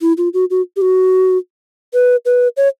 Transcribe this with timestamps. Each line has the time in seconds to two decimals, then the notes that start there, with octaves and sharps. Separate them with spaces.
0.01 E4
0.17 F4
0.34 F#4
0.50 F#4
0.76 G4
0.82 F#4
1.94 B4
2.26 B4
2.57 C#5